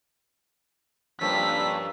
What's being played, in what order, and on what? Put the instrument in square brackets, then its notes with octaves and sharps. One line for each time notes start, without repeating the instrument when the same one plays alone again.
[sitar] G2 F3 [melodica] A#3 C#4 A4 [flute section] B4 E6 [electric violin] B6